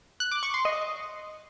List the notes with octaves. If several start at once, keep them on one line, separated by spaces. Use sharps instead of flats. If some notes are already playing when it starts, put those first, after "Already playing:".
F#6
D6
C#6
C6
D#5